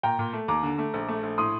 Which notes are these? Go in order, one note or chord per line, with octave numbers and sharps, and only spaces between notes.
A#2 G5 A#5
A#2
A3
D#2 A#5 D6
D3
A3
A#1
A3
A#1
A2 C6 D#6